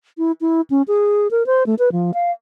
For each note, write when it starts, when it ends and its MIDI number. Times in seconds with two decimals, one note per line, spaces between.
0.18 0.32 64
0.41 0.61 64
0.70 0.82 61
0.88 1.28 68
1.31 1.46 70
1.46 1.63 72
1.66 1.75 57
1.79 1.92 71
1.92 2.11 53
2.14 2.31 77